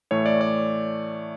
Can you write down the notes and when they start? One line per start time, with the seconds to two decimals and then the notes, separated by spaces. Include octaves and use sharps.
0.11 A2 E3 A3 C#5
0.26 D5
0.41 D5